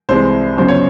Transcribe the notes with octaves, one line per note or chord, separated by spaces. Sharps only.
C2 C3 E3 G#3 C5
G1 F#2 C#3 C5
C#5